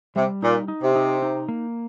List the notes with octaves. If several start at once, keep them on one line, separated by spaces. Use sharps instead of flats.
C3 G3
A#2 D#4
D#4
C3
D#4
D#4
A#3